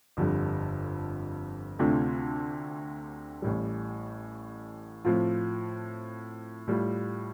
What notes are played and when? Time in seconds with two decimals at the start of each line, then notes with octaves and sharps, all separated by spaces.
0.17 G1 F2 D3 G3
1.79 D2 C3 A3 D4 F4
3.42 A1 A2 G3
5.05 A2 F3 C4 F4
6.67 A2 G3 F4